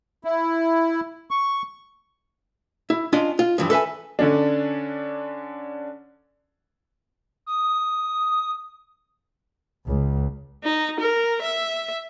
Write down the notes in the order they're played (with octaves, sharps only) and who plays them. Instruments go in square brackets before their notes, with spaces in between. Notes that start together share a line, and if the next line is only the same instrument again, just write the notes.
[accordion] E4
C#6
[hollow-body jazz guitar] E4
C#4 D4 F4 D#5
F4
G2 E3 F3
A4 B4 E5 G#5
[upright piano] D3 C#4 D4
[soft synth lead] D#6
[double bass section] C#2
[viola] D#4
A#4
E5